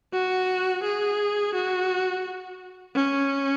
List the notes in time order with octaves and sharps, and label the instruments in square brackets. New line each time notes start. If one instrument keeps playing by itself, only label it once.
[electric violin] F#4
G#4
F#4
C#4